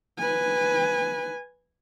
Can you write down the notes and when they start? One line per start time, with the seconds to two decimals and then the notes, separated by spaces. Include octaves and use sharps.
0.19 B4 G#5